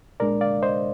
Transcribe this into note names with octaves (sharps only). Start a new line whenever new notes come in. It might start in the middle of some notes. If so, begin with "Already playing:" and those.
A#2 G#3 D4 A#4 D5
D5 F5
C5 D#5